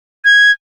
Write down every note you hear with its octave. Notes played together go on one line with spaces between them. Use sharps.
G#6